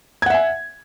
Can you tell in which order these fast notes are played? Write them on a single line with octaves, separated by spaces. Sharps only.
G#6 F#5 E5 G#5